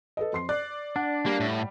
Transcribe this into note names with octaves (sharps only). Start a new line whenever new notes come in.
A4 B4 D#5
F2 C6 C7
D5 F#6
D4 F#5
G3 A#3
A2